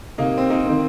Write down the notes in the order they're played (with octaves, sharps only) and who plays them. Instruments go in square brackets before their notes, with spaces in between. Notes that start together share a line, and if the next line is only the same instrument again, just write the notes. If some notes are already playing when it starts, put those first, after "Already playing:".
[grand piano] C3 [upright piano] A#3 D#4
[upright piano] C4
A#3 D#4
[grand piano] D#3 C4